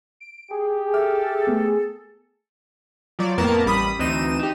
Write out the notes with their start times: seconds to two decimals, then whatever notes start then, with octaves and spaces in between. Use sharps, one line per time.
0.20 D7
0.51 G4 G#4
0.94 A4 E5 D6 F6
1.47 A3 B3
3.19 F3 F#3 D5
3.38 F2 A2 A#3 B3 A#4 A5
3.65 A1 G3 B5 D#6
3.99 D2 E3 C4 D#4 D#7 E7
4.39 D#4 G4